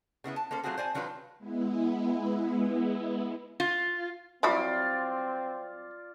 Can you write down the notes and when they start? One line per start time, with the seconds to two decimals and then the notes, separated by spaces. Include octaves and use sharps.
0.24 C#3 B3 E4 B4
0.36 A5
0.51 A#3 C#4 A4 C5
0.63 F#3 A3 C4 F4 F#4 G#4
0.77 C5 D5 G#5 A5
0.94 D#3 F#3 D4 F4 B4
1.38 G#3 B3 E4
3.60 F4
4.43 F#3 G3 C4 E4 F4 D5 C6